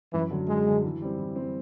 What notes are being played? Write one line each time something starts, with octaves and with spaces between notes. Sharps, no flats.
F#2 E3
D3 F#3
F#2 G#3
D3 F#3
E3
G3 C4
E3
G3 C4